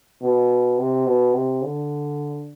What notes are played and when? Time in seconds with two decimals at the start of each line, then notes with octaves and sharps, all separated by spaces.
0.22 B2
0.78 C3
1.06 B2
1.34 C3
1.62 D3